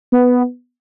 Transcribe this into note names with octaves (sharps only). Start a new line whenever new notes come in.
B3